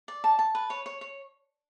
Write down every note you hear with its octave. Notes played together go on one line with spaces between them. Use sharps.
D5
A5
A5
B4
C#5
C#5
C#5